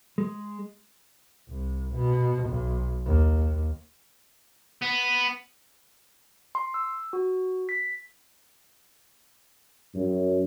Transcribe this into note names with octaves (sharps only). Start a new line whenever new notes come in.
G#3
C2
B2
B1
D#2
B3
C6
E6
F#4
B6
F#2